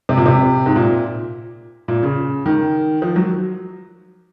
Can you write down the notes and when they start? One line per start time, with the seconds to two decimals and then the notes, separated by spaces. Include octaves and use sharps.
0.09 C3
0.17 A#2
0.26 C3
0.66 G#2
0.76 A#2
1.88 A#2
2.03 C#3
2.46 D#3
3.02 F3
3.16 F#3